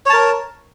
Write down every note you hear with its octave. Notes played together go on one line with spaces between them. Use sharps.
A#4 C#5 A5